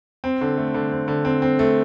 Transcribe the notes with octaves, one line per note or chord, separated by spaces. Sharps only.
C4
D3
A3
D3
C4
D3
C4
C4
A3